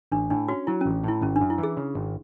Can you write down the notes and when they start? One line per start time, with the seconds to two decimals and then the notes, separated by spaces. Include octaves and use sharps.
0.12 A1 D4
0.30 A2 D4
0.48 C#4 F#4
0.67 F#3 E4
0.81 A1 C#4
1.04 A2 E4
1.22 G#1 C#4
1.36 F#2 D4
1.50 E4
1.58 E3
1.63 G#4
1.77 C#3
1.95 G#1